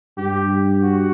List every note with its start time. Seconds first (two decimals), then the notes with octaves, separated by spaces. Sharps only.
0.18 G2 G4
0.83 F#4